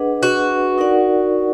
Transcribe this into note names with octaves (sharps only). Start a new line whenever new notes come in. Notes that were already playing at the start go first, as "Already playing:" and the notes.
Already playing: D4 G#4 B4 D#5 F#5
F#4
D#4 A#4 D5 F#5